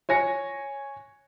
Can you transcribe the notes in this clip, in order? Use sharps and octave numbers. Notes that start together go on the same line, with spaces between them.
C#5 G#5 A#6 C#7